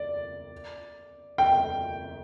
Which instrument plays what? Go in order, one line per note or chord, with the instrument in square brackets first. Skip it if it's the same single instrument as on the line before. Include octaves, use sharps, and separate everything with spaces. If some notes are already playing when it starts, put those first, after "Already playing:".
Already playing: [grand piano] D5
G5